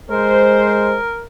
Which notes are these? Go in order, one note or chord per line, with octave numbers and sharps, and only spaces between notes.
G#3 A#4 C5